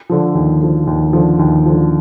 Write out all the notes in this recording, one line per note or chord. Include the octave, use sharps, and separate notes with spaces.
D3 F3
D#2
D3 F3
D#2
D3 F3
D#2
D3 F3